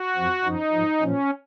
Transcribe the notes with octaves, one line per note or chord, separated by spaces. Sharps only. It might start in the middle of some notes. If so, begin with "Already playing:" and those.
Already playing: F#4
F2 F3
F#2 F3 D#4
G#2 F3
A#2 F3 C#4